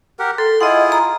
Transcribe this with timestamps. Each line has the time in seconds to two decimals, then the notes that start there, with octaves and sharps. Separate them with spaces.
0.19 G4 A#4 F#5
0.38 A4 C6
0.61 E4 F4 G#4 D#5 F#5
0.92 A#5